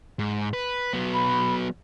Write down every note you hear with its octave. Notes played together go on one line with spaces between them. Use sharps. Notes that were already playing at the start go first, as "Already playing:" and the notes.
G#2
B4
F#3 B3
B5